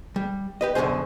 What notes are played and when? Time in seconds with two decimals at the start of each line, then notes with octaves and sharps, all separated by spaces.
0.16 G3
0.61 G4 B4 D#5
0.75 F#2 B2 D3 A3 G#4 C5